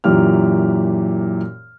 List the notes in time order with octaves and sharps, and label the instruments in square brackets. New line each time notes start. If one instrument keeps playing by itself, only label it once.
[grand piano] F#2 A#2 E3 G4 F6